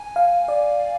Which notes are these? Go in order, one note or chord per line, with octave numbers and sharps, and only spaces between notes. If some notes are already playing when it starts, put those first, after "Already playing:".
Already playing: G#5
F5
D5